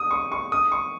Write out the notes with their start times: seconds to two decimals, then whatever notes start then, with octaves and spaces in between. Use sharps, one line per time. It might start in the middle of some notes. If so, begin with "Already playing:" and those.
Already playing: D#6
0.11 C#6
0.32 C#6
0.52 D#6
0.72 C#6